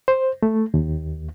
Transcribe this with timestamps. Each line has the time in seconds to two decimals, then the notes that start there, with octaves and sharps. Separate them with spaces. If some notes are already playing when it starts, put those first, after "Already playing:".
0.08 C5
0.43 A3
0.74 D#2